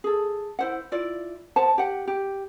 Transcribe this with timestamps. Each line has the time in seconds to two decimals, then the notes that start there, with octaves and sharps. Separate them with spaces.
0.04 G#4 A4
0.59 E4 C5 F#5
0.92 E4 F4 D5
1.56 C5 F#5 A5
1.78 G4 F#5
2.08 G4